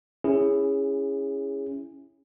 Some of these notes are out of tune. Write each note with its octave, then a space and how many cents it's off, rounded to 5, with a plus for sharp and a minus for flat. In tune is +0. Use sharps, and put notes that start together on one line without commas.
C#4 +0 E4 +0 G#4 -20